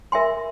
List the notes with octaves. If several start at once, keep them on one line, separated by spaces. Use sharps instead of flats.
A#4 E5 G#5 C6